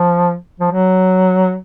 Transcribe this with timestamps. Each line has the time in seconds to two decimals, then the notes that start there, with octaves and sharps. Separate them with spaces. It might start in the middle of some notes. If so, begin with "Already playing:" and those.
Already playing: F3
0.60 F3
0.71 F#3